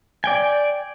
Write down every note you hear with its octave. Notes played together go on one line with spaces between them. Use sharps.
D5 G5 G#5